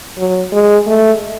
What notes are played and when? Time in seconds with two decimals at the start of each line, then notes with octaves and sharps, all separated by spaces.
0.18 F#3
0.53 G#3
0.87 A3